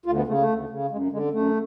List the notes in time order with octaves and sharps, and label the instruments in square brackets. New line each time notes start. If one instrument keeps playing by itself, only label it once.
[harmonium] D2 F4
B3
C#3 A3
A3
D2
C#3
F#2 G#3
D3 G#3
F#2 A3